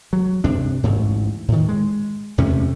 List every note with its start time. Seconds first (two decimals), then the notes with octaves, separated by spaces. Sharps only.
0.13 F#3
0.44 G2 C3 D4
0.84 A1 D2 G#2
1.48 A2 D#3
1.69 G#3
2.38 E2 C3 A3 C#4